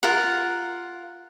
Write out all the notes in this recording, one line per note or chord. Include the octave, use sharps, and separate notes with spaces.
F4 A#4 F#5